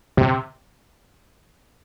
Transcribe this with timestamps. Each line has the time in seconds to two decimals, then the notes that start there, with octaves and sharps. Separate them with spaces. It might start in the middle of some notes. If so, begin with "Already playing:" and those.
0.17 C3